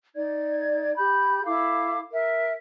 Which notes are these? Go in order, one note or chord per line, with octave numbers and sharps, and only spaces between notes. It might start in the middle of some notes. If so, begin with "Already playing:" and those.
D#4 D5 G#6
G4 B5 G6
E4 A4 F5 D6
A#4 E5